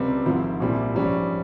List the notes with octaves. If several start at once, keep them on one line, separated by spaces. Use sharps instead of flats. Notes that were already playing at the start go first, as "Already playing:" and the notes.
Already playing: C#2 C3 G3 C4
G#1 G#2 F3 C4 E4
C2 A#2 G3 C4 E4
A#1 G#2 G3 C#4